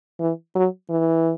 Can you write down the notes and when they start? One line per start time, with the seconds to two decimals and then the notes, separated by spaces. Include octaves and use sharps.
0.20 E3
0.55 F#3
0.90 E3